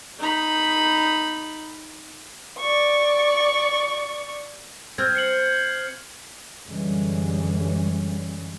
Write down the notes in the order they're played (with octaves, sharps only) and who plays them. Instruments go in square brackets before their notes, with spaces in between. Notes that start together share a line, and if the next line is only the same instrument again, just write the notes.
[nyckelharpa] D#4 B5
[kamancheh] D5 C#6
[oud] C4 [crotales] F6 G6 G#6
[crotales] C7 C#7 F#7
[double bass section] F#2 D3 E3 G3 G#3 C#4